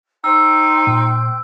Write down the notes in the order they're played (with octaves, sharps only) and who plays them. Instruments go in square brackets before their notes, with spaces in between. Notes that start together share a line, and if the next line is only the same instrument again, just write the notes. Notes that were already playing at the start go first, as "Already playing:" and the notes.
[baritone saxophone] D#4 [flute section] C5 G5 G6 [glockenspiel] E6
[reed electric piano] A#2